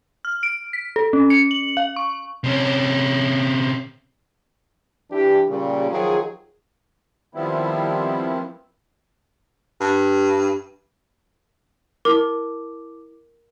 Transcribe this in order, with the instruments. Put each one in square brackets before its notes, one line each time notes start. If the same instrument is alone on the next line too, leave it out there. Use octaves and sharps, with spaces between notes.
[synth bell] F6
D7
B6
A4
C#4
C#7
F#7
F5
C#6
[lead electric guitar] C3 C#4
[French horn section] E3 D4 G4
A#2 C#3 G3
D#3 F3 F#3 F4 G#4
[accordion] D#3 F3 G3 B3 C4 E4
[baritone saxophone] G2
[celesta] E4 D6 [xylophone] A#4